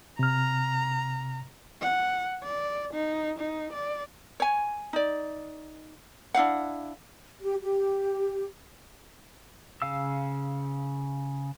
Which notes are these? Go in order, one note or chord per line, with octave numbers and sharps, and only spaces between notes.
C3 A#5 F6
F#5
D5
D#4
D#4
D5
C#5 G#5
D#4 D5
D4 E4 F5 F#5
G4
G4
C#3 F5 E6